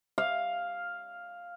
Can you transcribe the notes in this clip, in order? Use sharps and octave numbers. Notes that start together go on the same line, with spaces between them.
F5